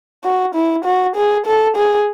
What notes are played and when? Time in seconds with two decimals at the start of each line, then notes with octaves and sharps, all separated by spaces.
0.24 F#4
0.55 E4
0.85 F#4
1.16 G#4
1.46 A4
1.77 G#4